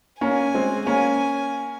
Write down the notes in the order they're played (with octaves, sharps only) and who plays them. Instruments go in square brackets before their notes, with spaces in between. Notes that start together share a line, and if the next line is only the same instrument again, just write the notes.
[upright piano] A#3 C#4 [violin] G#5
[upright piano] G#3 C4
[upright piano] A#3 C#4 [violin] G#5